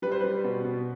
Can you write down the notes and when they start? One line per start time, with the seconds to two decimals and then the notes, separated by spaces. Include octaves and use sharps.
0.02 G3 B4
0.12 C5
0.20 G3 B4
0.44 B2
0.64 B2